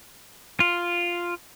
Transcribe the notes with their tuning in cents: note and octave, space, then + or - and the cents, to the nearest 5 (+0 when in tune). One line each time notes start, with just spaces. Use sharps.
F4 +0